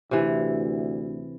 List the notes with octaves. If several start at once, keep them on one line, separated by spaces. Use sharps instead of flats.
D2 C3 E3